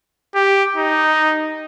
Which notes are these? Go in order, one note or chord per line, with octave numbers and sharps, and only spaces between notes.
G4
D#4